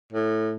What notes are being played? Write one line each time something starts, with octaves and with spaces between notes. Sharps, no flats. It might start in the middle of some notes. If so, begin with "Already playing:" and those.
A2